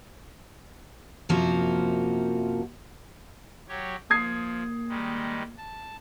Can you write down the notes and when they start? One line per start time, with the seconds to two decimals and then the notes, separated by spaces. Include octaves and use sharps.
1.29 F#2 C3 F3 A#3 F#4
3.68 F#3 G4 C#5
4.10 F3 A#3 D#6 G#6 C7
4.89 D#3 G3 G#3
5.57 A5